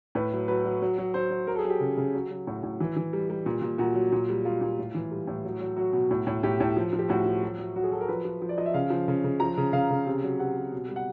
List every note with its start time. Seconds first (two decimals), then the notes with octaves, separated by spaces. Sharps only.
0.15 A2 B4
0.33 F#3
0.48 F#3 B4
0.65 F#3
0.82 F#3
0.98 F#3
1.14 F#3 C5
1.31 F#3
1.47 F#3 A#4
1.55 A4
1.59 G#4
1.65 F#3 G4
1.80 C#3
1.97 C#3
2.14 F#3
2.31 F#3
2.47 A2 F#4
2.63 A2
2.80 E3
2.96 E3
3.13 G3
3.30 G3
3.46 A#2
3.62 A#2
3.78 A#2 F#4
3.95 F#3
4.12 A#2
4.29 G3
4.45 G3 F4
4.61 A#2
4.79 A2
4.95 E3
5.11 G3
5.27 A2
5.45 F#3
5.61 F#3
5.76 F#3 F#4
5.93 B2
6.11 A2
6.27 A2
6.43 A2 G4
6.60 A2
6.77 F3
6.93 F3
6.99 G4
7.09 A2 F#4
7.26 F3
7.43 F#3
7.58 F#3
7.76 F#3 F#4
7.83 G#4
7.92 F#3 A4
8.01 A#4
8.08 F3 B4
8.25 F3
8.42 F3
8.49 D5
8.58 F3 D#5
8.66 E5
8.74 C#3 F5
8.90 F3
9.08 C#3
9.24 C#3
9.40 F3 A#5
9.58 C#3
9.73 C#3 F5
9.91 C#3
10.07 C3
10.23 F#3
10.39 C3 F#5
10.57 C3
10.72 B2
10.88 G3
10.96 F#5